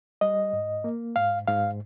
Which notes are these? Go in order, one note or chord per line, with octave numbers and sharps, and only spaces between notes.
G3 D#5
G#2
A#3
G#2 F5
G#2 F5